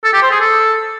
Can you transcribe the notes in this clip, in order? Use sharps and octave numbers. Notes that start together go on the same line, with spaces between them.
A4
G4
C5
G#4
A4